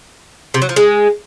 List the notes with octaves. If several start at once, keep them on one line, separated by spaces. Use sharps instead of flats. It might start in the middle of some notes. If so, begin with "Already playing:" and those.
C3
F#3
F3
G#3